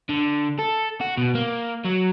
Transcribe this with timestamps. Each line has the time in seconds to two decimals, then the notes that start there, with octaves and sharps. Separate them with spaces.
0.09 D3
0.58 A4
1.00 F#4
1.17 B2
1.35 A#3
1.85 F#3